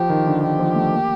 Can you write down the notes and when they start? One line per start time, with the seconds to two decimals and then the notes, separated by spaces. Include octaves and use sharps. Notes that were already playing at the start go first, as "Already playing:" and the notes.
Already playing: F3 G4
0.09 D#3
0.27 D3
0.43 D#3 G4
0.59 F3
0.75 A3
0.91 A#3